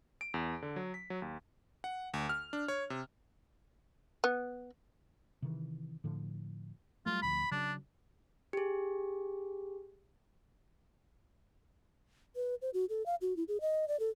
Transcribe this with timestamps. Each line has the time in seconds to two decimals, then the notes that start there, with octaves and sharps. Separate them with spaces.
0.21 D7
0.34 E2
0.62 D3
0.76 F#3
0.94 B6
1.10 F#3
1.22 D#2
1.84 F#5
2.14 D2
2.29 F6
2.53 D4
2.68 C#5
2.90 C3
4.24 B3
5.42 C3 D#3 E3
6.04 A2 D3 F3
7.06 F#3 G3 A3 F4
7.22 D1 D2 F3 B5
7.51 C#3 F#3 D4
8.53 G4 G#4
12.36 B4
12.62 C5
12.74 F#4
12.89 A4
13.06 F5
13.21 F#4
13.37 E4
13.48 G#4
13.61 D#5
13.88 D5
14.00 A4